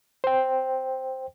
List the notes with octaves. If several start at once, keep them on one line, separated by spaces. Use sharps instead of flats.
C5 G5